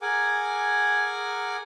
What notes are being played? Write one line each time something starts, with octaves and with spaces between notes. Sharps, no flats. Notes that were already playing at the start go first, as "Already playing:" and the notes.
G#4 A#4 F#5 G#5 D6